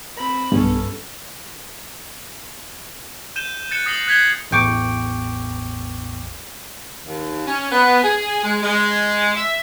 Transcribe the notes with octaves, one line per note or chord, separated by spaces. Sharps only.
C4 B5
B1 G2 B3 C#4 A4
G6 D#7 E7 G7
F#6 A6 C#7 E7 G7
D#6 A#6 C7 F#7 G7
F#6 G#6 B6 C7 F7 G7
A1 E2 G5 C#6 D6
D#2
C#4
B3
G#4
G#3
G#3
E5